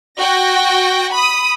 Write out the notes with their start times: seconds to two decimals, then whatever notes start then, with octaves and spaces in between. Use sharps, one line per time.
0.20 F#4 G5 A#6
1.14 B5 D#6